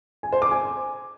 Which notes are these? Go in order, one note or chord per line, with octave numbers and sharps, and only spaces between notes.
G#5
C5
D6
G#5